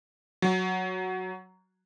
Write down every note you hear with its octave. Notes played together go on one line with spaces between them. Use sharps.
F#3